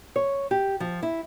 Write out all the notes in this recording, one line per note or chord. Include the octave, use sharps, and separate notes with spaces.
C#5
G4
F3
E4